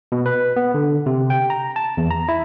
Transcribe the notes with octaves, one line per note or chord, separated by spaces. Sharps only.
B2
B4
B3
D3
C3
G5
A#5
A5
E2
A#5
E4